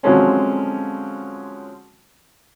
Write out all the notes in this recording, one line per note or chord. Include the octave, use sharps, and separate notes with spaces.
D3 F3 F#3 G#3 C4 C#4